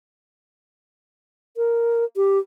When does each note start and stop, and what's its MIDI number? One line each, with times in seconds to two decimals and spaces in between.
1.57 2.04 70
2.16 2.39 67